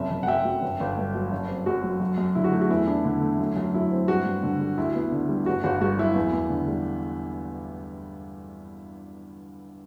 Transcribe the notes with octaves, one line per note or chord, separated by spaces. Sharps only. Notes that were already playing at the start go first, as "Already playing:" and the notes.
Already playing: F#1 C3 E5
F#1
F#5
F#2 E5 G5
F#3
G1
G1
G2
F#3
F#1
C4
F#2 F#4
F#3
F#2
F#2
D3 E4
F#4
A3 E4
F#4
E2 E4
D4 E4
D3
A3
F#2
F#2
F#3 E4
C4
G2 F#4
G2
D3
G3
D2 E4
B3
D3
G3
G1 F#4
G1 F#4
G2 F#4
F#3 E4
E2
E2
D3
G3